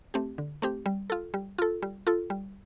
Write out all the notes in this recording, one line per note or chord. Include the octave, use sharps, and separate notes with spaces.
A3 C4 G4
D3
A3 C4 G4
G3
F4 A4
G3
F4 A4
G3
F4 A4
G3